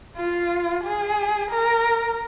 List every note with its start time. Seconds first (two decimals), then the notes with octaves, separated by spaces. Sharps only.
0.17 F4
0.84 G#4
1.51 A#4